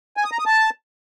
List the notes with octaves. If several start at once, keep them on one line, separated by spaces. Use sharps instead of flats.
G#5
D#6
A#5
D#6
A5